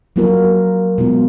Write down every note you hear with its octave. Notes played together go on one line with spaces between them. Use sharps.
F#3 A#3 F4 A#4
B2 G#3 B3 F4